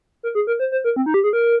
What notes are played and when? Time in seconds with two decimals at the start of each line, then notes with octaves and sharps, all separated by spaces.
0.23 A#4
0.35 G#4
0.47 A#4
0.60 C5
0.72 C5
0.84 A#4
0.96 C4
1.06 D#4
1.14 G4
1.24 G#4
1.33 A#4